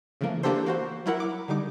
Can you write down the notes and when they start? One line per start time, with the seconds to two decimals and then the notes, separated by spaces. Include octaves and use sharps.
0.21 C#3 E3 F3 A3 A#3
0.43 E3 A#3 D4 G4 A4 C5
0.66 A#3 F#4 C5
1.06 F#3 E4 A#4 F#5
1.20 D6
1.48 D3 G3 D#4 D6